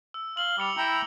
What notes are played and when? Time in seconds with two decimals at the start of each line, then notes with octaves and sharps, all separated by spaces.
0.14 E6
0.37 F5 F#7 G7
0.58 G3 D6 C#7 F7
0.77 E4 G5 A#5